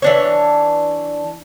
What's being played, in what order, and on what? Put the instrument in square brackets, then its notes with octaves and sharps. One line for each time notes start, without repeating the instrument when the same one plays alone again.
[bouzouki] E3 D4 C#5